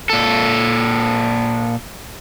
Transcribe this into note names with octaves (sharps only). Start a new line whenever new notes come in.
A#2 A4